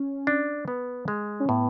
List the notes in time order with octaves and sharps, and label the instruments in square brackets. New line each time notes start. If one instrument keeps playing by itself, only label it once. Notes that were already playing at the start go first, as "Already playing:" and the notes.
Already playing: [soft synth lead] C#4
[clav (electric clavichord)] D4
B3
G#3
[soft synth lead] C#4
[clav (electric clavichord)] A2 [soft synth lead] B3